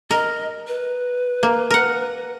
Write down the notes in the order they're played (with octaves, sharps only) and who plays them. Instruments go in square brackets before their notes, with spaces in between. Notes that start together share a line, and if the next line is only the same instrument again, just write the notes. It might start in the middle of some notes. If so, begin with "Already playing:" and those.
[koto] A#4 [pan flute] D#5
[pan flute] B4
[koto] A#3
A#4 F#5